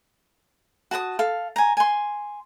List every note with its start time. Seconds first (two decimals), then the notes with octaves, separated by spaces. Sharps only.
0.91 F#4 A5 B5 D#6
1.19 A4 F5
1.56 G#5 A#5
1.77 G#5 C6